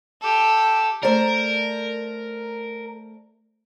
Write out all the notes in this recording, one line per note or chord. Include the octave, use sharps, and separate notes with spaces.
G4 A4
A3 A#4 C5 D5